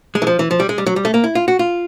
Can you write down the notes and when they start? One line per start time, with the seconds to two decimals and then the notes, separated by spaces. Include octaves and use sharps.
0.15 G#3
0.22 E3
0.27 F3
0.39 E3
0.51 F3
0.60 G3
0.69 G#3
0.78 G3
0.86 F#3
0.96 G3
1.05 A3
1.14 A#3
1.24 E4
1.35 F4
1.48 F#4
1.59 F4